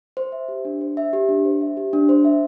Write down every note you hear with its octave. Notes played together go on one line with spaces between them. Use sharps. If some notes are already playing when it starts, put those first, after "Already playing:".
C5
E5
G4
D4
C5
E5
G4
D4
C5
E5
G4
D4
C5
E5